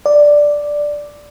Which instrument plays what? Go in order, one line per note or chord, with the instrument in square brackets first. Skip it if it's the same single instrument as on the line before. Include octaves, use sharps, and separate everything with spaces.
[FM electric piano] D5